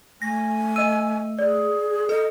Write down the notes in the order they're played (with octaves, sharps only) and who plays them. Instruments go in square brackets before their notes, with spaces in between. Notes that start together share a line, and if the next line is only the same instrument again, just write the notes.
[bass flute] A3 [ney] G#5 [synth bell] A#6
[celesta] D#5 D#7 [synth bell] E6
[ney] G#4 [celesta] D5
[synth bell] A4 [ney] D#5